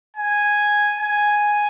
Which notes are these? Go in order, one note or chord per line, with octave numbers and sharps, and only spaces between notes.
G#5
G#5